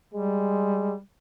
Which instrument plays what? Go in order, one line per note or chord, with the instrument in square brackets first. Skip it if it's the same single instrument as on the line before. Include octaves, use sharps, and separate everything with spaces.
[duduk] G3 [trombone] G#3